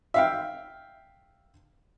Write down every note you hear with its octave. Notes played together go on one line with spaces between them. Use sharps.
E5 F5 G5